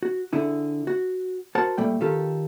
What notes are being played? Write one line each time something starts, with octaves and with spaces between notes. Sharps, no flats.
F#4
D3 E4 G#4
F#4
F#4 A#4 C5 F#5 A5
A#2 G3 A3 G5
D#3 F4 G4 A4